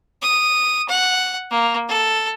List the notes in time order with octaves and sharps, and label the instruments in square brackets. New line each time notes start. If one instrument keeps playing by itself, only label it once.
[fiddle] D#6
F#5
A#3
A4